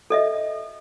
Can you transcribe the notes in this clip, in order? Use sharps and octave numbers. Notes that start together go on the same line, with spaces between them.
A4 D#5 E5